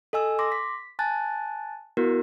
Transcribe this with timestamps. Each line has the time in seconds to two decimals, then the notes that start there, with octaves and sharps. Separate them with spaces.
0.13 A4 D#5 G#5 E6
0.39 C6 D6 A#6
0.52 B6
0.99 G#5 A5 F#6 A6
1.97 B3 E4 F#4 A#4